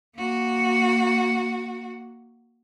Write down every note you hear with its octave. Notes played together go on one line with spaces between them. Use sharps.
A#3 F#4